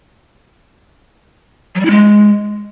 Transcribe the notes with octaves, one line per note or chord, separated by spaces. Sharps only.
F#3
G3
E4
G#3